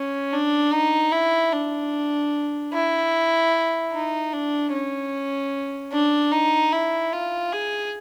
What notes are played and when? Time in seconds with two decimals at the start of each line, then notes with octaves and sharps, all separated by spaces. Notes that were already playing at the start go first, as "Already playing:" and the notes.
Already playing: C#4
0.33 D4
0.73 D#4
1.12 E4
1.53 D4
2.73 E4
3.93 D#4
4.33 D4
4.73 C#4
5.92 D4
6.32 D#4
6.72 E4
7.12 F4
7.52 G#4